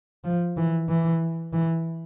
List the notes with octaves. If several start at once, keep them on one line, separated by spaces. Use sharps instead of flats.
F3
E3
E3
E3